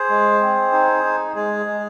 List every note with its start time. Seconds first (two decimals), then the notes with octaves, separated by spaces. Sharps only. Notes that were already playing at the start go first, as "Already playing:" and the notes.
Already playing: G#4 C5
0.10 G#3
0.41 C4
0.72 D#4
1.04 D#4
1.36 G#3 G#4
1.66 G#3